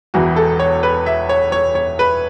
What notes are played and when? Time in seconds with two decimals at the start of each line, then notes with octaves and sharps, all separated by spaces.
0.14 E1 E2 E3 F#4
0.36 A4
0.59 C#5
0.83 B4
1.06 E5
1.29 C#5
1.52 C#5
1.75 C#5
1.99 B4